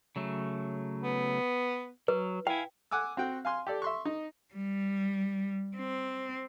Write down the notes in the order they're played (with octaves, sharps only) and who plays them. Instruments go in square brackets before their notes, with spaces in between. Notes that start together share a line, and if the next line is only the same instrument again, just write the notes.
[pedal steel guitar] C#3 F#3 A3
[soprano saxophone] B3
[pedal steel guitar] F#3 [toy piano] B4
[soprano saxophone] E4 [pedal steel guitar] F5 G#5 [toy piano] G5
[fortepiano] F#5 G#5 D6 E6
C4 F#4 G5
F5 G#5 C6
G4 A4 D5
E5 C6 C#6
D#4
[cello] G3
C4